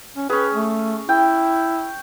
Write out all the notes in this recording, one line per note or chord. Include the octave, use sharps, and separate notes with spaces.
C#4
C#4 G#4 B4
A3
E4 G5